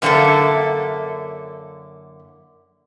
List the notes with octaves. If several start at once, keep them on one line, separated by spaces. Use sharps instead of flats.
F#2 D3 A#3 D4 E4 A4